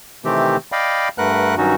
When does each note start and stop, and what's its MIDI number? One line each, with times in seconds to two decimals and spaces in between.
0.25 0.57 48
0.25 0.57 51
0.25 0.57 52
0.25 0.57 57
0.25 0.57 60
0.25 0.57 67
0.72 1.09 74
0.72 1.09 75
0.72 1.09 77
0.72 1.09 79
0.72 1.09 83
1.18 1.55 43
1.18 1.55 57
1.18 1.55 70
1.18 1.55 71
1.18 1.55 78
1.18 1.55 90
1.58 1.75 43
1.58 1.75 51
1.58 1.75 54
1.58 1.75 61
1.58 1.75 63
1.58 1.75 66